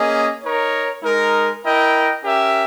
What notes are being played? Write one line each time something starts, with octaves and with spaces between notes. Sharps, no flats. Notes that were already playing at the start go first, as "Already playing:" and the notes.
Already playing: A#3 C#4 G#4 D#5
D#4 A#4 C#5
G#3 D#4 A#4
E4 A#4 D#5 G5
C#4 G4 A#4 E5